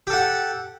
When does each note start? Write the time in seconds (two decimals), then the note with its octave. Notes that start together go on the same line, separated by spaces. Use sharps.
0.07 G4
0.10 A4
0.13 F#5